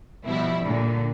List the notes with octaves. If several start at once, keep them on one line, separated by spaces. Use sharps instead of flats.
B2 F3 G3 E4
A#2 D3